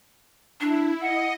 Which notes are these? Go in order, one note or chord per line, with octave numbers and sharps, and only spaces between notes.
D4 E4
D#5 F#5